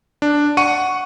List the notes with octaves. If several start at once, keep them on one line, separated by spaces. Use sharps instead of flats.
D4
F#5 C#6 C#7 D#7